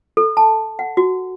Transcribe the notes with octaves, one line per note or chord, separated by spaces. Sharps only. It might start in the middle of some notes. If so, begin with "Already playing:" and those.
A4
A5
F#5
F#4